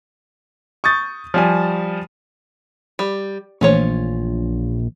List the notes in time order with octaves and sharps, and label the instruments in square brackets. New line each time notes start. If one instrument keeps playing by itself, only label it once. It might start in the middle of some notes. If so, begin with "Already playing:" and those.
[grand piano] C#6 D#6 G6 A6
F3 G3 G#5
[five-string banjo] G3
[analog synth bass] A#1 [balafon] E3 A3 C5 [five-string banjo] C#4 F4 C#5